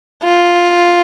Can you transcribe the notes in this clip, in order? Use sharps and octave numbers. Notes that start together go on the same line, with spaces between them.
F4